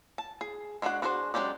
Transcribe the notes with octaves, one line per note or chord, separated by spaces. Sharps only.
A5
G#4
G#3 D4 F#4 G#4 F#5
B3 D4 F#4 G#4 C5
F#3 G#3 C#4 G4 D5